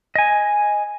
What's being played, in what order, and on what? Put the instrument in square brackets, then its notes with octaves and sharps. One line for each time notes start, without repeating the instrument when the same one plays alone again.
[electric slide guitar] D#5 G#5